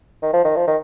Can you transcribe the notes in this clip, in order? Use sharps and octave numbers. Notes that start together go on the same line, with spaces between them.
D#3
F3
D#3
F3
D#3